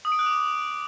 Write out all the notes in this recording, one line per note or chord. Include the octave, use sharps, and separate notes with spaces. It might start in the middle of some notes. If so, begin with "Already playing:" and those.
D#6
D7
F#6
D6